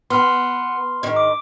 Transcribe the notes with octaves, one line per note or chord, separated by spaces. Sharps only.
B3 C6 F6
G#2 D#3
D6